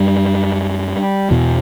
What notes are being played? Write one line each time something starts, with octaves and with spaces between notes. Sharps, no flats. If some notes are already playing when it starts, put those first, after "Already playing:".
Already playing: F#2 G3
E2 B2